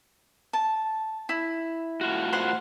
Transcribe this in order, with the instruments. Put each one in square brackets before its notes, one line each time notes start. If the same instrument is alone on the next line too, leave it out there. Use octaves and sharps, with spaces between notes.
[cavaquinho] A5
E4
[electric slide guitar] A2 F4 F#4
[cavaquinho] C5 F#5 C6